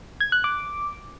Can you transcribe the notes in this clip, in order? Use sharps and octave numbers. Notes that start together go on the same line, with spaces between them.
G#6
F#6
D6